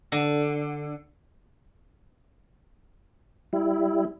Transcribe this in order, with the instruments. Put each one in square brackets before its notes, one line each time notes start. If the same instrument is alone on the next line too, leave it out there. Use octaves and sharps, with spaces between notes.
[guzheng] D3
[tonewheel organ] G3 E4